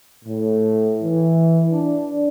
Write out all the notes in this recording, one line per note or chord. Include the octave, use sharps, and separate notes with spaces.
A2
E3
D4